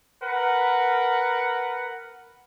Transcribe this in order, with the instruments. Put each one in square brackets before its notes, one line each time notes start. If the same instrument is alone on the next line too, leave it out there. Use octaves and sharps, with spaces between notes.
[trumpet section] A#4 B4 F#5